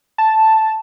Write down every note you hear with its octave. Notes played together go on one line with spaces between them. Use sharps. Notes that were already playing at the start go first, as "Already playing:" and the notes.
A5